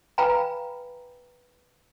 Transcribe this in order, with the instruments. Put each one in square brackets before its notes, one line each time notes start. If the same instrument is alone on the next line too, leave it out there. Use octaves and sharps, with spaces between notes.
[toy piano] B4 F5 G5 G#5 A#5 B5